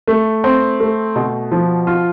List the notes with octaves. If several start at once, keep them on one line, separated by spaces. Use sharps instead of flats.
A3
C4
A3
B2
F3
F4